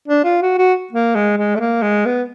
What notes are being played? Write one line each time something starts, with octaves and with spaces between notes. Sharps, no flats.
D4
F4
F#4
F#4
A#3
G#3
G#3
A3
A#3
G#3
B3